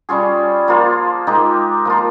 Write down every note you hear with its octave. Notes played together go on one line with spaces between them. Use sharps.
G3 C#4 F4 G#4
F3 A#3 F4 C5
G#3 D#4 G4 A#4
F3 A#3 F4